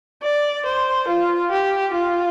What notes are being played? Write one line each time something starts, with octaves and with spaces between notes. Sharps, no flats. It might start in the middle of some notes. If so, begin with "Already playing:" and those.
D5
C5
F4
G4
F4